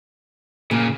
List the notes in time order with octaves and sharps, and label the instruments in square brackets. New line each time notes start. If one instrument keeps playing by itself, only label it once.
[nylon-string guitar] A#2 [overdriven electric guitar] C#3 A#3